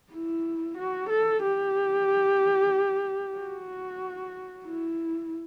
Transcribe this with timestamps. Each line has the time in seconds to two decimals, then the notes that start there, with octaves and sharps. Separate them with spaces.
0.13 E4
0.78 F#4
1.09 A4
1.43 G4
3.38 F#4
4.66 E4